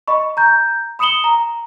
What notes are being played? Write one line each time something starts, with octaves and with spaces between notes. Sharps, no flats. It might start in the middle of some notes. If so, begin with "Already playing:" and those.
D#5 B5 C#6
A#5 G6
B5 D#6 C#7 E7 F#7 G7
A#5